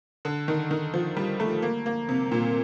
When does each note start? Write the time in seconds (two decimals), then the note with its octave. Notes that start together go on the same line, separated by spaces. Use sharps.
0.25 D3
0.48 D#3
0.71 D#3
0.94 F3
1.17 G3
1.40 A3
1.62 A#3
1.86 A#3
2.09 C3
2.32 A#2